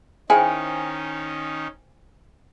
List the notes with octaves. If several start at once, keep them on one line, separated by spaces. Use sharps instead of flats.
D#3 C#4 D#4 E4 G#4 C5 G5 G#5